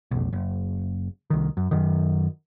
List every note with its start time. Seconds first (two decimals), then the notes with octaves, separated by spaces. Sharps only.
0.11 F1 B1
0.33 F#1
1.30 C2 D#3
1.57 F#2
1.71 F#2 D#3